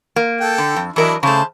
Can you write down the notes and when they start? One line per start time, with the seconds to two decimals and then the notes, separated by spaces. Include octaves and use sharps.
0.16 A#3
0.41 A4 G5
0.58 D3
0.76 F2
0.96 E3 F#3 D4 E4 A#4 D#5
1.23 C#3 A3 G#4 C5 A5